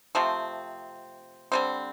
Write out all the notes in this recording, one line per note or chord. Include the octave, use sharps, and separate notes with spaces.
C3 F3 A3 C4
D3 G3 C4